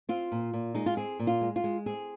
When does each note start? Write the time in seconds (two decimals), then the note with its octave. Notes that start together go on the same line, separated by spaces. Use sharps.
0.09 C4 F4
0.32 A#2
0.53 A#2
0.75 G#3 D#4
0.86 F4
0.97 C4 G#4
1.19 A#2
1.27 F4
1.41 G#3
1.56 F4
1.64 G#3
1.86 C4 G#4